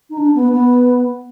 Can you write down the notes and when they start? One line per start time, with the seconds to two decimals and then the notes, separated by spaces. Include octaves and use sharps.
0.09 D#4
0.17 D4
0.35 B3
0.52 B3